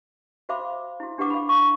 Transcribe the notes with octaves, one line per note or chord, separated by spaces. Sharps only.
F#4 C5 E5 F5 B5 D6
E4 F#4
D4 G4 B4 F#5 D6
F5 B5
C#6